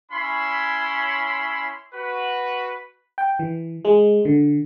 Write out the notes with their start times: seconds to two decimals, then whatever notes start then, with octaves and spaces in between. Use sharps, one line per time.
0.12 C#4 E4 C#5 B5 C6
1.94 F#4 B4
3.18 G5
3.39 E3
3.85 G#3
4.25 D3